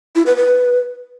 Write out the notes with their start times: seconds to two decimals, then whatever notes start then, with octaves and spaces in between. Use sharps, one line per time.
0.16 E4
0.26 B4
0.37 B4